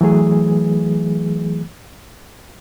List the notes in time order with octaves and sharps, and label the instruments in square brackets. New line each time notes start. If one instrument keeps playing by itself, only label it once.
[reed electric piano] E3 F#3 A3 G#4